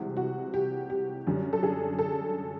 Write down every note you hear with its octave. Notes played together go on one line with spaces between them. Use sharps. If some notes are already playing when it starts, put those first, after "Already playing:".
Already playing: C2 C3 E3 G#3 F#4
F#4
G4
G4
F#2 D3 G3
A4
G#4
A4